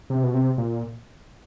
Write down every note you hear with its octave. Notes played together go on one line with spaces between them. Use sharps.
C3
B2
C3
A#2